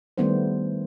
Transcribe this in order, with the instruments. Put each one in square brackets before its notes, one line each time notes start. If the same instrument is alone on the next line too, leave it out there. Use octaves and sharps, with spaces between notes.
[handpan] D#3 G3 A3 B3 D4 C5